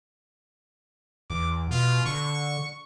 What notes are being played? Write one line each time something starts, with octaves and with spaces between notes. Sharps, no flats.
E2 D6
B2 F4
D3 C#6